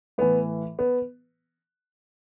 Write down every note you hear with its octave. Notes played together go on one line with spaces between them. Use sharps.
A2 E3 B3
B3